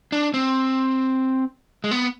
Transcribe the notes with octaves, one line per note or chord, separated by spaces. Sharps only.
D4
C4
G#3
B3